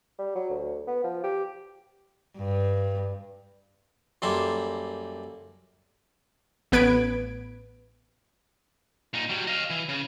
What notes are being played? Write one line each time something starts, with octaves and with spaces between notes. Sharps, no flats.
G3
F#3
D2
B3
F3
G4
G2
F#2 G3 A#3 A4 C6
A1 B3 B4 G#6 D7
A#2 D#4
F#3 G3
D#5 F5
E3
C#3